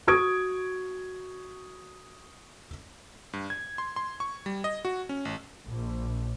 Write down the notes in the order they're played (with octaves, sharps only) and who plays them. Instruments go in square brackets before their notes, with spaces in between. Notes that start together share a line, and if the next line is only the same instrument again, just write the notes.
[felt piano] F#4 C#6 D#6 G#6 D7
[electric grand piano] G2
G#6
C6
C6
C#6
G3
D#5
F#4
C#4
A1
[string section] A#1